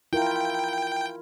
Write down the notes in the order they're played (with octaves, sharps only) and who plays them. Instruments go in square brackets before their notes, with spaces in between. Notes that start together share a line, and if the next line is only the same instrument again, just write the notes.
[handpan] E4 F4 A#4 [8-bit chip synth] G5